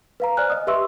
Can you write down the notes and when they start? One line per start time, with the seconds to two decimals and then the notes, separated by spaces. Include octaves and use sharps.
0.20 B4 F5 A#5
0.37 C5 D5 G#5 F6 F#6
0.50 D#5 D#6
0.67 G4 B4 E5 C6 C#6 E6